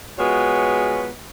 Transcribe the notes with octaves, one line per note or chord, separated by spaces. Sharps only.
G#3 B3 F4 F#4 C#5